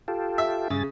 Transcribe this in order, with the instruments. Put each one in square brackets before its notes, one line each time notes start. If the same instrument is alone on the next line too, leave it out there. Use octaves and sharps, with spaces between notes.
[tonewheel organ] F4 G4 A4
[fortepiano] E5
[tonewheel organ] G2 G#4 A6 [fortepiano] C#3